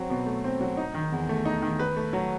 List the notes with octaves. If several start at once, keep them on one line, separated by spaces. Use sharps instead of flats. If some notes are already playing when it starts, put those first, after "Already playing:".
Already playing: F#3 C4
B2
A3
C4
F#3
D#4
D#3
E2
A3
D#4
D#3
B4
A3
F#3